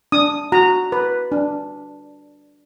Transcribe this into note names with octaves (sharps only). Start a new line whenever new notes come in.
D4 D#6
F#4 A#5
B4
D4